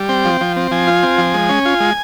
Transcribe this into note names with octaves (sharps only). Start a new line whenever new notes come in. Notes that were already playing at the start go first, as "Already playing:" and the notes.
Already playing: G3
C4 G5
F3
F3
C4
F3 G#5
F4
C4
F3
G#3
C#4
F4
G#3